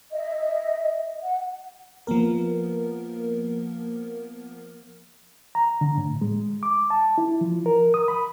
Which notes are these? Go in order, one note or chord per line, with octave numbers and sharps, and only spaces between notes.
D#5 E5
F#5
F3 A#3 B3 A#4
A#5
D3
A2
G#3
D6
A5
E4
F3
A#4
D#6
B5